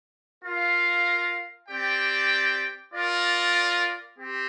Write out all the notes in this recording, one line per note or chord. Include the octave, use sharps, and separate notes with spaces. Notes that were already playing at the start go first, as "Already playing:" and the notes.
F4 A#4 F5
C4 G4 D5 G5
F4 A#4 D5
C4 G4